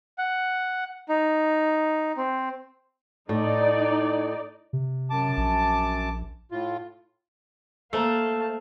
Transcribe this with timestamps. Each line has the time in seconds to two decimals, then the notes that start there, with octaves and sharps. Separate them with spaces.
0.18 F#5
1.09 D#4
2.17 C4
3.29 A2 D#4 D5
4.73 C3
5.10 F#2 A5 D6
5.37 A#1
6.52 A2 F4
7.93 A3 A#3 A4 C5 F5 A5 A#5